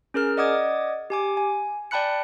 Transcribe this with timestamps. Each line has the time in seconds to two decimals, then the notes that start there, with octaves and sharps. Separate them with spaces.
0.14 C#4 G#4 A#4 F6
0.37 D5 D#5 F#5 D6 D#6 G#6
1.10 G4 G#5 D6
1.37 G#5
1.91 D5 G5 A5 B5 F#6 C#7